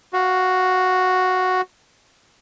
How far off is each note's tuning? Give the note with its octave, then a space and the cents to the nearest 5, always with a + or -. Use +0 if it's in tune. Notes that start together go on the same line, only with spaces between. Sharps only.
F#4 +0 F5 +15